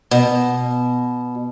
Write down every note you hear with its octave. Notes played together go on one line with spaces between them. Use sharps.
B2